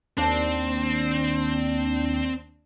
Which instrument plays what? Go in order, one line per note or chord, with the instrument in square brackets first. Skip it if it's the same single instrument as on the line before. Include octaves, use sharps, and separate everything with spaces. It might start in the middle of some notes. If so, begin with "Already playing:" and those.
[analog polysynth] D#2 D4 [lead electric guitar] C4